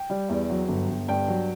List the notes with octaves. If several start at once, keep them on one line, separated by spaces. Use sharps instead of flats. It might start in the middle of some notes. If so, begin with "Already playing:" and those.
Already playing: G5
G3
E2
F#3
G1
G1
G2 G5
F#3